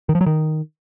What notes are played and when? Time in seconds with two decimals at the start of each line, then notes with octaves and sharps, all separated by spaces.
0.09 D#3
0.15 F3
0.21 F#3
0.26 D#3